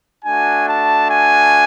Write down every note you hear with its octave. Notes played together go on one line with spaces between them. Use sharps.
A3 D4 F#4 G#5
A5
G#5